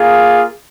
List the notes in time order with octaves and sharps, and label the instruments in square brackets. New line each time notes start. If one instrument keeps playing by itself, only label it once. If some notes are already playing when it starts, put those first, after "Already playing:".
Already playing: [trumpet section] A#3 F4 G#4